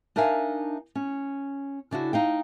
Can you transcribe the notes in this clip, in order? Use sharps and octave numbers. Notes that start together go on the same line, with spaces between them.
D4 D#4 A#4 E5 F5 G#5
C#4
C#3 D4 E4 F#4
D#4 F5 G5